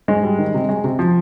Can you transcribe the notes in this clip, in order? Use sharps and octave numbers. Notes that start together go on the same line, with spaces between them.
G#2 G#3
G3
D#3
C3
G#3
C3
F3